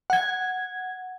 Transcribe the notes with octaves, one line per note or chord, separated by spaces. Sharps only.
F#5 G#6